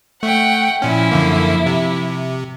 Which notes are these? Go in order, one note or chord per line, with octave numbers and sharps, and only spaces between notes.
A3 F#5 G5
A#2 F3 C#4 E4
F#2 D3 A#3
C3